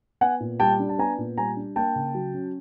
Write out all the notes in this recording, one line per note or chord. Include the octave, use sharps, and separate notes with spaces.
B3 F#5 G#5
A#2
G3 G5 A5
D4
A5
B3 G#5 A#5
A#2
G3 G#5 A#5
D4
A#3 G5 A5
C#3
F#3
C#4